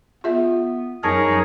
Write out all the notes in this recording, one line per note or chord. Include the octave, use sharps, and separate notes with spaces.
B3 F4 G#4 E5
F#2 D#4 G#4 A#4 C#5 A5